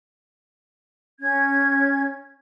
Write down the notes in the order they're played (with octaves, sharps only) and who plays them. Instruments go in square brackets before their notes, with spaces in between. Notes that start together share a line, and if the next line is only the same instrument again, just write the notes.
[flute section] C#4 G#6